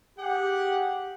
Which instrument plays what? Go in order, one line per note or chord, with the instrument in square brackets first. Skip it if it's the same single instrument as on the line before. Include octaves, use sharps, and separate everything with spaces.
[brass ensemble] G4 [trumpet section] G#4 F#5